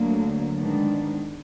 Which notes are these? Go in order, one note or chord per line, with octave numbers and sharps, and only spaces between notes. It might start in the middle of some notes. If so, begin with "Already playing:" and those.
Already playing: D2 D3 F#3 A#3
G#2 D#3 G#3 B3 D4